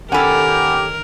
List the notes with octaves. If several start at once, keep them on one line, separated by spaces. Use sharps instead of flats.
D#3 C#4 G4 A4 A#4 F#5 G#5 B5